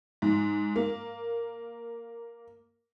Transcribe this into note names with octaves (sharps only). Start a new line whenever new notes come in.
G#2
A#3